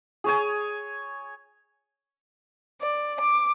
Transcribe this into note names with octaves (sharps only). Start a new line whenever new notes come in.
G#4 C#5 G#5
D5
D6